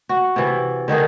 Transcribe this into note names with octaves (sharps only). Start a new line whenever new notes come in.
F#4
C3 E3
D3 D#3 D#4 G#4